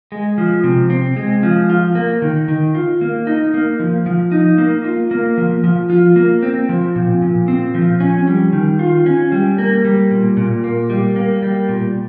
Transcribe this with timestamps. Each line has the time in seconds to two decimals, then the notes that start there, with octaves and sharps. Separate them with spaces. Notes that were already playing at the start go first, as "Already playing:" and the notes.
0.12 G#3
0.38 F3
0.64 C3
0.90 C4
1.16 G#3
1.43 F3
1.70 F4
1.95 A#3
2.22 D#3
2.48 D#3
2.75 F4
3.01 A#3
3.27 D#4
3.54 A#3
3.80 F3
4.06 F3
4.32 D#4
4.58 A#3
4.84 F4
5.11 A#3
5.38 F3
5.64 F3
5.90 F4
6.16 A#3
6.43 C4
6.69 F3
6.95 A#2
7.22 A#2
7.48 C4
7.74 F3
8.00 C#4
8.27 G3
8.53 D#3
8.79 F4
9.06 C#4
9.32 G3
9.58 A#3
9.85 G3
10.11 A#2
10.37 A#2
10.64 A#3
10.90 G3
11.16 A#3
11.42 G3
11.69 A#2